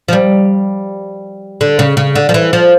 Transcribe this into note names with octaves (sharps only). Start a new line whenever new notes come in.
F3
G3
D3
C#3
C#3
D3
F3
E3
F3